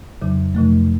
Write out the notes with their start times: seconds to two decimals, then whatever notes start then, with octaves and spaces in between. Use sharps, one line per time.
0.22 F2 C#3 F#3
0.55 F2 C3 F3 A3